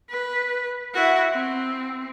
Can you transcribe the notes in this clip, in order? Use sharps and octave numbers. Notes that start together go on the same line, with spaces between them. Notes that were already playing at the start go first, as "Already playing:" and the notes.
B4
E4 F#4
C4